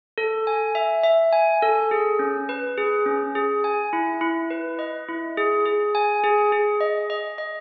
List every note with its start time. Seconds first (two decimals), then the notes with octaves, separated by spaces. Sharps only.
0.18 A4
0.47 G#5
0.75 E5
1.04 E5
1.33 G#5
1.62 A4
1.91 G#4
2.19 C#4
2.49 B4
2.78 G#4
3.06 C#4
3.35 G#4
3.64 G#5
3.93 E4
4.21 E4
4.50 B4
4.79 D#5
5.08 E4
5.37 G#4
5.66 G#4
5.95 G#5
6.24 G#4
6.52 G#4
6.80 D#5
7.10 D#5
7.38 D#5